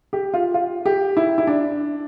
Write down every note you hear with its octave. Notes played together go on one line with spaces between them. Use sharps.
G4
F4
F4
G4
E4
E4
D4